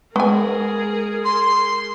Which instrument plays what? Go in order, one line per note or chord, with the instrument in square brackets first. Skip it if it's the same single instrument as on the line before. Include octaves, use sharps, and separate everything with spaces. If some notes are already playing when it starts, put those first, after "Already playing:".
[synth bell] G#3 [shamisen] B3 G#5 [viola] G#4 A#4
[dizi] C6